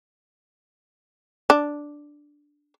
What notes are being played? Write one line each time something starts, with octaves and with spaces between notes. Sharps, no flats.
D4